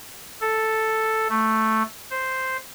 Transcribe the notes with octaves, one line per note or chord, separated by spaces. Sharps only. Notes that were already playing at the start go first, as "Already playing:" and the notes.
A4
A3
C5